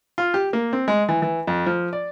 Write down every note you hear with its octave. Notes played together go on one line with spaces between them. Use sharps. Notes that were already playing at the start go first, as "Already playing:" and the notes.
F4
G4
A#3
C4
G#3
E3
E3
F2
F3
D5